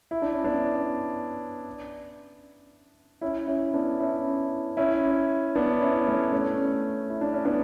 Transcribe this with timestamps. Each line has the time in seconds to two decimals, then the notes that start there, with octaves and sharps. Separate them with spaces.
0.11 E4
0.22 D4
0.33 C#4
0.44 B3 D4
3.21 C#4 E4
3.47 C#4 E4
3.73 B3 D4
3.99 C#4 E4
4.77 C#4 E4
5.55 B3 D4
5.81 C#4 E4
6.06 A3 C#4
6.32 A3 C#4
7.10 E4
7.21 D4
7.34 C#4
7.45 B3 D4